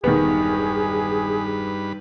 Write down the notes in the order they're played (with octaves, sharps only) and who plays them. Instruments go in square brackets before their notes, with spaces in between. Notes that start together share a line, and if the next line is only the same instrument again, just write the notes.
[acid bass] E1 [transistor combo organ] G2 B4 [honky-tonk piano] D#3 B3 [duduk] G#4